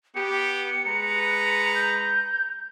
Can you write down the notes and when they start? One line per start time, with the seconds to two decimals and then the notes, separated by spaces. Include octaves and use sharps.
0.15 B3 G4 C#7
0.86 G#3 B4 A#5
1.75 G6